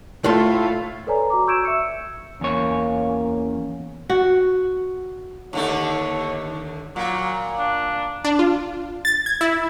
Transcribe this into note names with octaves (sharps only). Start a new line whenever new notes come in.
A2 A3 F4 C6
A4 B4 C#5 D5 G#5 A#5
F#4 A#5 D6
C#6 E6 G6 G#6 D7 E7
E5 E6 C#7
E2 A#3 C#4 C#5
F#4
D#2 D3 A3 C#5
A#2 F#3
D4
D4
F4
A6
G#6
E4